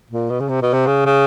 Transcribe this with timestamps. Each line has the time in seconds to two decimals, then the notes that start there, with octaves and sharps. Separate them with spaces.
0.10 A#2
0.30 B2
0.40 C#3
0.49 C3
0.62 B2
0.73 C3
0.87 C#3
1.05 C#3